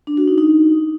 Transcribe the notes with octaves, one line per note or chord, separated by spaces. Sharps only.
D4
F#4
D#4
D#4